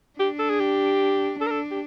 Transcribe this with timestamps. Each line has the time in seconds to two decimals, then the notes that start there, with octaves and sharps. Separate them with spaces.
0.19 D4 G4
0.39 A4
0.50 G#4
0.60 G4
1.40 D4 A4
1.47 A#4
1.51 A4
1.71 G4